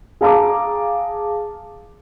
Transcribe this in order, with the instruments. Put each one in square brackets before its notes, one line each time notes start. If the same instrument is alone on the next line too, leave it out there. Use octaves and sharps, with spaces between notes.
[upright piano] G#4 F5 A5 A#5 D6